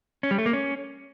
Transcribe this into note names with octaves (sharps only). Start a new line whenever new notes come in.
C#4
G3
A3
A#3
C#4